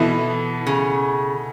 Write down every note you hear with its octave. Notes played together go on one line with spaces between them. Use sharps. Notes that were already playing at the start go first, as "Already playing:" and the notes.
Already playing: B2 E3 B3 E4 A4
C#3